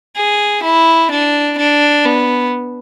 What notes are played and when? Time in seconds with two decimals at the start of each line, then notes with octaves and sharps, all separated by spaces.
0.16 G#4
0.63 E4
1.11 D4
1.57 D4
2.05 B3